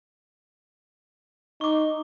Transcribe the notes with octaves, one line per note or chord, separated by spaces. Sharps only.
D#4 C#6 D6